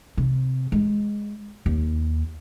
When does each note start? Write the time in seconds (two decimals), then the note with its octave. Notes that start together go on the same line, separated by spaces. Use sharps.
0.17 C3
0.72 G#3
1.66 D#2